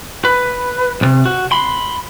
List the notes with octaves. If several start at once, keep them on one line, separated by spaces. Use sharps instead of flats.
B4
B1 C3
F#4
B5 C6